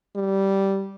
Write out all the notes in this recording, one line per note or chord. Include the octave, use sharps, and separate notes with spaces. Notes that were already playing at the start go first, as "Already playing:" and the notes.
G3